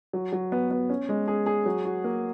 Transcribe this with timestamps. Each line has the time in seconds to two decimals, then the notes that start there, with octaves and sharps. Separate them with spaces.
0.13 F#3
0.32 F#3
0.52 B3
0.71 B3
0.89 C#4
1.09 G#3
1.28 G#4
1.46 G#4
1.66 F#3
1.85 F#4
2.04 A#3